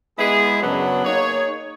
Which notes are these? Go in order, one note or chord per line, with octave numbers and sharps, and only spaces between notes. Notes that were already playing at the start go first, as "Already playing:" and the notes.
G#3 B3 E4 G#4
F#2 C#3 F#3 B3 D4
A#3 D#4 G#4 C#5